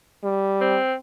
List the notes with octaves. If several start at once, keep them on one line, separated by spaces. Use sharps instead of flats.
G3
C4